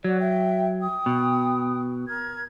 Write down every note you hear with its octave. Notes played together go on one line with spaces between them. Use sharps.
F#3 F#4 D5
E5 G5
G5 D#6
B2
A#4 G#6